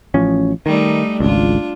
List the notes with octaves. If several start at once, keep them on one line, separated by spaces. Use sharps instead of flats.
A1 F3 C#4
D#3 G3 A3 D#4
G#1 C#2 D4 F4